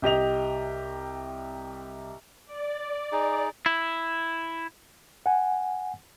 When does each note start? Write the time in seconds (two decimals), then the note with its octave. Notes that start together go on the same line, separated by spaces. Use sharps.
0.02 C2 G4 D#5 F7
2.46 D5
3.12 D#4 G#4
3.66 E4
5.26 F#5 G#5